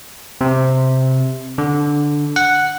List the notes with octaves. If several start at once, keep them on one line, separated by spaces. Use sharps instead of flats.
C3
D3
F#5